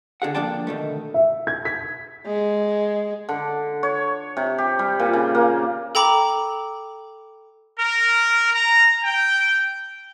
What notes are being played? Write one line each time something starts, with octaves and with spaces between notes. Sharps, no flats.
D3 G#4 F#5
F3 A#3 D4 D5 G5 A5
D2 B2 D#3 A3
E5
G#6
B6
G#3
D3
C#5
C3
G4
G3
A#2
C#3
A#3
A4 G5 A#5 B5 D6
A#4
A#5
G5